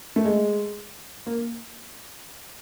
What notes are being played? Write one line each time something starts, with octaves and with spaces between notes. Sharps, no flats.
A3
G#3
A#3